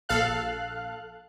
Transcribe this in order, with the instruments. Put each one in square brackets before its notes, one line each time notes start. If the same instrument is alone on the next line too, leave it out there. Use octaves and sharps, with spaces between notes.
[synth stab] A#1 A4 F5 F#6